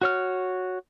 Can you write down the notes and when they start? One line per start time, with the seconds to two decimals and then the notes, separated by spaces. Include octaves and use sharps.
0.01 F#4 C#5 F6